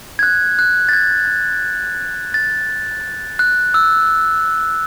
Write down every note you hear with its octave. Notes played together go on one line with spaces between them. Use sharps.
G#6
F#6
F#6
A6
G#6
A6
F#6
E6